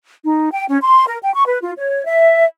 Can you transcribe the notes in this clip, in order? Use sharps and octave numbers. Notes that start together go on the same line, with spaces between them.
D#4
G5
C#4
C6
A#4
G5
C#6
B4
F4
C#5
E5